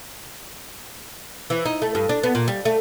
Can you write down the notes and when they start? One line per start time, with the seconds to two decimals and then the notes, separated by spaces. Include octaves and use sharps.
1.50 E3
1.66 D#4
1.82 A3
1.95 G2
2.09 D4
2.23 B3
2.35 A#2
2.48 G3
2.65 A3